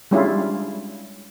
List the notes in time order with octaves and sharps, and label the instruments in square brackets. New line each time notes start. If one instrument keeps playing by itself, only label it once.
[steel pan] G3 G#3 C#4 D4 E4 F4